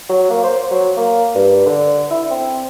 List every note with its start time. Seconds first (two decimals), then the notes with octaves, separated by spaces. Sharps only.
0.09 F#3
0.30 A#3
0.44 C5
0.71 F#3
0.97 A#3
1.35 G2
1.67 D3
2.11 E4
2.31 C4